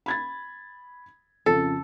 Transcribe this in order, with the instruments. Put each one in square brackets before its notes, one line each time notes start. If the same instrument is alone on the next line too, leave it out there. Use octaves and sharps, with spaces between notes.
[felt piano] B5 G#6 A6
[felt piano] F2 C#3 [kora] A4